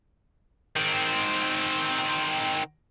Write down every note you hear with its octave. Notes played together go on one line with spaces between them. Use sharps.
D#3 C4